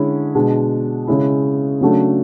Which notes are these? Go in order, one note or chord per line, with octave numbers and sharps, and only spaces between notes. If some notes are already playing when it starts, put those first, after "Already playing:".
Already playing: D3 G#3 C#4 E4
B2 G#3 D4
C#3 G#3 C#4 E4
C#3 F#3 A3 D4